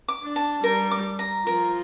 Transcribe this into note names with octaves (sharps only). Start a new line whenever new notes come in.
D6
D4
A5
G3 A#4
D6
A#5
F3 A#4